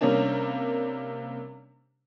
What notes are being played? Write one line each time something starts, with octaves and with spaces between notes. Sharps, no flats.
C3 G3 A#3 C#4 D4